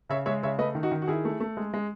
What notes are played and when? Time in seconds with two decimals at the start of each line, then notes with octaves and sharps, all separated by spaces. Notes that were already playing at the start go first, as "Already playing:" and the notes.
0.10 C#3 C#5 E5
0.26 G#3 C#5 E5
0.43 C#3 C#5 E5
0.58 A3 B4 D#5
0.75 D#3
0.83 D#4 F#4
0.92 D#3
1.02 F#4
1.08 D#3 E4 G#4
1.25 A3
1.40 A3
1.57 G#3
1.74 G#3